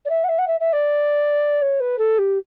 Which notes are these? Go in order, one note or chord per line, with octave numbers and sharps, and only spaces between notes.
D5
E5
F#5
E5
F#5
E5
E5
D5
C#5
B4
A4
G4